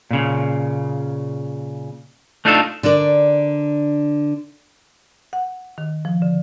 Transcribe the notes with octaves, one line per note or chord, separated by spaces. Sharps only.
A#2 C#3
A3 D4 D#4 F4 G4 A4
D3 D4 A#4 D5
F#5
D#3
F3
D3